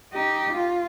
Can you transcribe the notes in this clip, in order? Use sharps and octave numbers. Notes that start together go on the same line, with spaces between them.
D#4 G4
F4